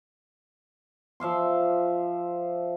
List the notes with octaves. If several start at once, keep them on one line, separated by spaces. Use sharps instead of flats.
F3 E5 F5 C6